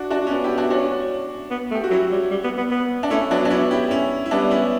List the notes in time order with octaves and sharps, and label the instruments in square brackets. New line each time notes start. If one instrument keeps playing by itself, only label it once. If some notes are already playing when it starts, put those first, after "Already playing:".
Already playing: [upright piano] D4 F#4
D4 F#4
C#4
B3 D4
E4 G4
D4 F#4
[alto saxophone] C#4 [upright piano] D4 F#4
[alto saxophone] B3
A3
[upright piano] G4
F#4
[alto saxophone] F#3 [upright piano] C#4 E4
[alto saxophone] G3
G3
B3
B3
B3
[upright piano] D4
[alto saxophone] A3 [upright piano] C#4 E4
[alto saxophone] F#3 [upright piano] B3 D4
[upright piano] D4
C#4 E4
E4 G4
C#4 E4
E4
[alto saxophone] G3 [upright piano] B3 D4
[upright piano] C#4 E4